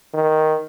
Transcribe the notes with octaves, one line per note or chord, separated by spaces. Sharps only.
D#3